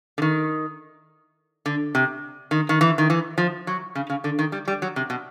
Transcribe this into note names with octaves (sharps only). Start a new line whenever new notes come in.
D3
D#3
D3
C3
D#3
D#3
E3
D#3
E3
F3
F#3
C#3
C#3
D3
D#3
G3
G3
F#3
C3
B2